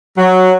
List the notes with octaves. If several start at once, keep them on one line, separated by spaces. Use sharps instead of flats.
F#3